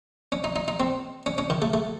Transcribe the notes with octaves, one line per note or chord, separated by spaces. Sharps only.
C#4
D#4
D#4
D#4
C4
C#4
C#4
D#3
A3
A3